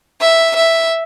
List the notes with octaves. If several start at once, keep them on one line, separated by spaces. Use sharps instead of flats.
E5
E5